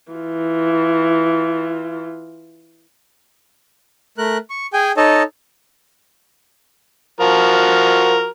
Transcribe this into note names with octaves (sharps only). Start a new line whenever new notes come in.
E3 F4
A3 A#4 F#6
C#6
G#4 G5 G#5
D#4 A4 C#5 D#5 A5
F3 F#4 A#4